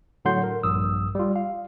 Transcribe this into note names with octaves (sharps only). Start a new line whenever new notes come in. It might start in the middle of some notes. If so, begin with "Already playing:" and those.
A2 D3 F#3 F#5 C6 G6
A#4
A#1 G2 D#6 E6
G3 F4
F5